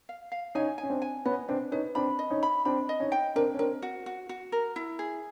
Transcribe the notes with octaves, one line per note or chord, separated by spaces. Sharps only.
F5
F5
C#4 D#4 G#5
G#5
C#4
C4 D4
G#5
B3 C#4 D#5
C4 D4 B4
C#4 D#4 B4
C4 D4 B5
D#5
C#4 D#4
B5
C4 D4 B5
D#5
C#4 D#4
G5
C4 D4 A#4
C#4
C4 D4 A#4
F#4
F#4
F#4
A#4
E4
G#4